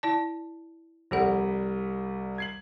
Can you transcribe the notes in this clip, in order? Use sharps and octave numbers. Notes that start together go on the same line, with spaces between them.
E4 D5 A5
C2 F3 G3 A4 F#5
G#6 C7 F#7